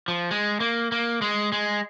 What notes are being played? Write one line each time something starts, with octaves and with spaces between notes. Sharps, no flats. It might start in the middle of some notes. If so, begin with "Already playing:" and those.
F3
G#3
A#3
A#3
G#3
G#3